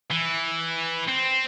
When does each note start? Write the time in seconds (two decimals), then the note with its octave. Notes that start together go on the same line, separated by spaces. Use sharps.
0.11 E3
1.09 C4